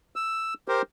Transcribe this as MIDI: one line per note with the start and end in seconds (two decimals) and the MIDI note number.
0.16 0.54 88
0.68 0.82 67
0.68 0.82 70
0.68 0.82 72